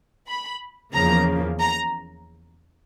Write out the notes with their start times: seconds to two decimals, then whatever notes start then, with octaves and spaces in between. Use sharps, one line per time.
0.28 B5
0.94 E2 C#3 F3 A#3 A#5
1.61 A#5